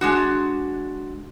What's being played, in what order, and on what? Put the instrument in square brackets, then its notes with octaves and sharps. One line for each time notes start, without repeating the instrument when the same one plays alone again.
[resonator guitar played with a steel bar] G#3 D4 F#4